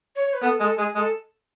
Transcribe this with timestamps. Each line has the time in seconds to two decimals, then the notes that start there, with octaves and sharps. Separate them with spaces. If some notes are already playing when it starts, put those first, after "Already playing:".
0.16 C#5
0.33 B4
0.42 B3 A4
0.59 G#3 A4
0.78 G#3 G#4
0.95 G#3 A4